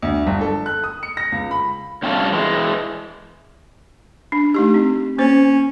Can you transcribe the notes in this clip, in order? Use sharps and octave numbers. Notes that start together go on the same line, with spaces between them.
D2
G1
A4
F#6
D#6
C#7
A#6
C#2
B5
G2 C3 G3 C#4 F4 A4
E3 G#3
D4
A3 D#4 G4
C4
A#3 C#4 C5